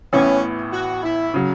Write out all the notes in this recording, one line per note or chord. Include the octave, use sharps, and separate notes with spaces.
A1 A2 E3 B3 C#4
F#4
E4
C#3 F#3